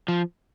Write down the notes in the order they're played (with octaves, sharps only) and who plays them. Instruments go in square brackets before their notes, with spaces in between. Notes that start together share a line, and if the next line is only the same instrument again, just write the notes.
[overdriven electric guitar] F3